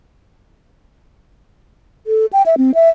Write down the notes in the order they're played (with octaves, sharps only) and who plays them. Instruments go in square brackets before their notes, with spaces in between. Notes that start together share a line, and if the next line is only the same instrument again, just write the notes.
[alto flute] A4
G5
E5
C4
E5